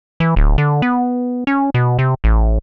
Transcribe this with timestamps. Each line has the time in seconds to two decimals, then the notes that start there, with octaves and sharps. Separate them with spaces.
0.20 E3
0.36 D1
0.58 D3
0.82 B3
1.47 C#4
1.74 B2
1.99 C3
2.24 A1